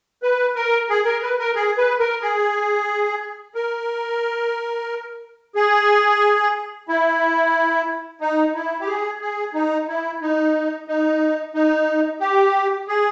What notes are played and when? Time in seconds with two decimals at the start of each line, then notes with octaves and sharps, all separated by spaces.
0.23 B4
0.55 A#4
0.89 G#4
1.05 A#4
1.23 B4
1.39 A#4
1.55 G#4
1.77 B4
1.99 A#4
2.22 G#4
3.55 A#4
5.55 G#4
6.89 E4
8.21 D#4
8.54 E4
8.80 G4
8.87 G#4
9.21 G#4
9.54 D#4
9.88 E4
10.22 D#4
10.88 D#4
11.54 D#4
12.20 G4
12.88 G#4